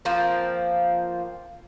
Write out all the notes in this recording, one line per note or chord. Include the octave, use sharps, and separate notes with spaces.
F3 A#3 C4